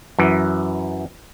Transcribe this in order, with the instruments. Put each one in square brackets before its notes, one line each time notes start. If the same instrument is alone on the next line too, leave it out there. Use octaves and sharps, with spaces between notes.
[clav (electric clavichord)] F#2 E3